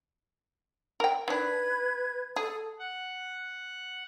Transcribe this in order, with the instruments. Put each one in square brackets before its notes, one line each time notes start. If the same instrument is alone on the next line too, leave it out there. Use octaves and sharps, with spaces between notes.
[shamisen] A#4 G5
[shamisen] D#3 D4 [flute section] B4 G#6
[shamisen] G#4 [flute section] A4 A5 D#6
[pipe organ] F#5